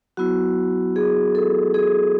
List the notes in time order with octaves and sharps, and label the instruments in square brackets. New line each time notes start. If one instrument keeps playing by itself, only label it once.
[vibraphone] F#3 B3 E4 F#4
G#4
A4
G#4